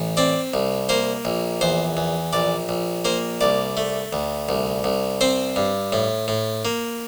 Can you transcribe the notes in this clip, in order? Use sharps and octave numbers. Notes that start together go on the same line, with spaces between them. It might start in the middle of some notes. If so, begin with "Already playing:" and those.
Already playing: A1
C4 D5
C2
A#3 C5
A#1
E2 C5
E2
A#1 D5
A#1
A#3 C5
C2 D5
A3
D2
C2
C2
C4 C5
G2
A2
A2
A#3